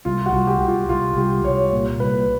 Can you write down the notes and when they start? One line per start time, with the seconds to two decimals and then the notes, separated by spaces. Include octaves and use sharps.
0.05 C2 F4
0.26 F#4
0.33 C2
0.47 G4
0.61 C2
0.68 F4
0.89 C2 F4
1.16 C2 G4
1.45 C2 C#5
1.73 A#2
2.00 C2 B4